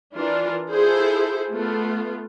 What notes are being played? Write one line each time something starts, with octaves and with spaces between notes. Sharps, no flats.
E3 D4 F4 A#4
E4 F4 G#4 A4 C5
A3 B3 F4